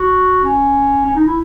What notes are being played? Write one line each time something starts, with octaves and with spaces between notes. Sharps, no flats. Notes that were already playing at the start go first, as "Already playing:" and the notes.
Already playing: F#4
C#4
C#4
D#4
E4